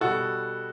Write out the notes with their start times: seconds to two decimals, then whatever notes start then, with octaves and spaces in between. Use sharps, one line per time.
0.01 B2 G3 F#4 A4